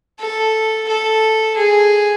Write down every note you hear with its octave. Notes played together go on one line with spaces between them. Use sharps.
A4
A4
G#4